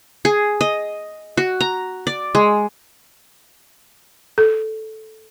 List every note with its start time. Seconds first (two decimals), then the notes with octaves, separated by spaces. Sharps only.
0.25 G#4
0.61 D#5
1.37 F#4
1.60 A#5
2.07 D5
2.35 G#3
4.38 A4